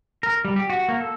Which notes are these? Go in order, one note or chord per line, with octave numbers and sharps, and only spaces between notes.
A#4
G3
G4
F#4
A#3
A4